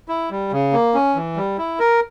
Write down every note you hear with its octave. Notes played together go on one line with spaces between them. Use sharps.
E4
G3
C#3
A#3
C#4
E3
G3
E4
A#4